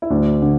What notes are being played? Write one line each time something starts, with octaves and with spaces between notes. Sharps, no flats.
E4
D2 D4
D3